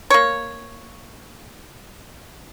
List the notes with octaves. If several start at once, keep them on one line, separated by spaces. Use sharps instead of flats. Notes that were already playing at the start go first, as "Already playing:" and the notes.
A#3 C#5